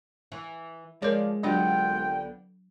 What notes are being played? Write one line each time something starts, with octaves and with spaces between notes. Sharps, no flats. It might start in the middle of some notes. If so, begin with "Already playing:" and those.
E3
F3 G#3 A#4 C#5 D5
C2 D3 F#3 B3 D4 F4 F#4 G5